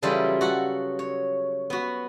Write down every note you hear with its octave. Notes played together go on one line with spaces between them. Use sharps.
C#3 E3 F#3 G3 F4 A4
F#4 A4 F#5
C#5
B3 F#4